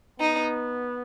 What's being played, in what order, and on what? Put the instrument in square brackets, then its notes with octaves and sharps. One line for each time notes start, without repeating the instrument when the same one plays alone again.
[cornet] B3 [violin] D#4